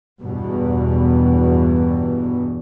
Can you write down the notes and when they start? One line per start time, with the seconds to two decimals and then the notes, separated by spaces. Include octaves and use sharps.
0.20 E2 G2 B2